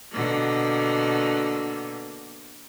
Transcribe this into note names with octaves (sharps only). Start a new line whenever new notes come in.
B2 D3 A#3